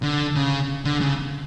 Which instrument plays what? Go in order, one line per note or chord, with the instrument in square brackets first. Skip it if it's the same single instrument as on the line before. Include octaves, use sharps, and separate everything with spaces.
[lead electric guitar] D3
C#3
D3
C#3